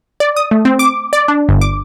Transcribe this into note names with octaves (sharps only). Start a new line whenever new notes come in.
D5
D#6
A3
C4
D6
D5
D4
G1
D6